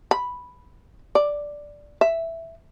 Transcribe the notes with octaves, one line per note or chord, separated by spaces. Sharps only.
B5
D5
E5